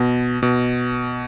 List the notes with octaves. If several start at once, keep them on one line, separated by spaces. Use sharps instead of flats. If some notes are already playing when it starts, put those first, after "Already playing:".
Already playing: B2
B2